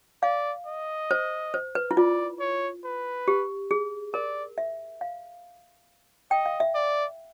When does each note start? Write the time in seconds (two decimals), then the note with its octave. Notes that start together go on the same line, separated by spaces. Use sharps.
0.23 D5 F5
0.67 D#5
1.11 C5
1.54 C5
1.75 B4
1.91 E4
1.97 F4 D5
2.40 C#5
2.84 B4
3.28 G4
3.71 G#4
4.14 A#4 D5
4.58 E5
5.01 F5
6.31 D#5 G5
6.46 F5
6.60 E5
6.75 D5